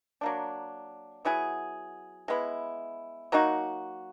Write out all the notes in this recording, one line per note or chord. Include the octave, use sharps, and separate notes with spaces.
F#3 A#3 D4
F#3 B3 E4 G#4
G#3 B3 E4
F#3 A#3 D#4 F#4